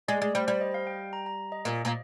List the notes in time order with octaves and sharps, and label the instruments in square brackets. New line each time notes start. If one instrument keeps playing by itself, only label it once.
[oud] G#3 [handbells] D5
[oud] G#3 [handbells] D5
[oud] G3 [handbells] C5
[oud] G3 [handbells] C5
[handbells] D#5
F5
G5
A#5
A#5
D#5
[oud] A#2 [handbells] D#5
[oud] A#2